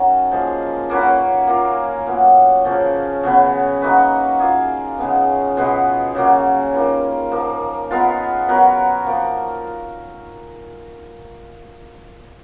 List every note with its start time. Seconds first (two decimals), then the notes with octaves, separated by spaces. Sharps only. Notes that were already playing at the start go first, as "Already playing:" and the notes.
Already playing: D#3 F#3 C#4 D#4 A#4
0.31 A#2 F3 G#3
0.90 A#3 C#4 F#4 B4
1.47 A#3 F4 A#4
2.06 A#2 F#3 B3
2.64 C#3 F3 A#3 C#4
3.23 C#3 F#3 B3
3.82 A#3 D#4 F#4 B4
4.40 A#3 F4 G#4
4.99 C#3 G#3 B3
5.57 B2 G#3 B3
6.15 C#3 F#3 A#3 C#4
6.73 D#3 A#3 F4 B4
7.31 F3 A#3 D#4
7.91 G#3 B3 F4 A#4
8.48 F#3 B3 F#4 A#4
9.07 F3 A#3 F4 A#4